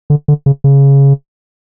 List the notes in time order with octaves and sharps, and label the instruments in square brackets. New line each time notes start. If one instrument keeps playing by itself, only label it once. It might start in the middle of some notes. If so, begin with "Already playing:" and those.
[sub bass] D3
D3
C#3
C#3